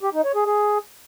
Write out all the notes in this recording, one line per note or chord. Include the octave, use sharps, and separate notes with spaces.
G4
D#4
C#5
G#4
G#4